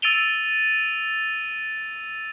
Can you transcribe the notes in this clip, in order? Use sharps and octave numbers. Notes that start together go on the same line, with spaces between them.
E6 A6 D7 D#7 F7 G7